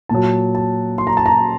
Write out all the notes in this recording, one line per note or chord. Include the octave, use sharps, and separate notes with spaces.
A#2 F#3 A5
A5
C6
A#5
A5
A#5